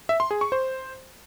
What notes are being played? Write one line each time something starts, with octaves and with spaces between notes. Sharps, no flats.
E5
C6
G#4
C#6
C5